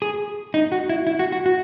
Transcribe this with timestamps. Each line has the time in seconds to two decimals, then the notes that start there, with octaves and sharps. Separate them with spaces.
0.02 G#4
0.54 D#4
0.72 F#4
0.89 E4
1.07 E4
1.19 F#4
1.32 F#4
1.46 F#4